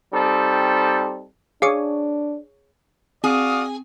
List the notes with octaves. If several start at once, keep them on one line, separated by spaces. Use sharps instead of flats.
G3 C4 D#4 A4
D4 G#4 C#5 F5 D6 D#6 C#7
C4 F#4 G#4 D5 F5 D#6